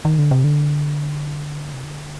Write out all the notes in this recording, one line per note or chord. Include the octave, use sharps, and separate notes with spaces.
D#3
D3
C3
D3
C3
D3